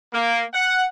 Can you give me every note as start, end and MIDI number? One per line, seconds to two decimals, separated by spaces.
0.13 0.43 58
0.54 0.84 78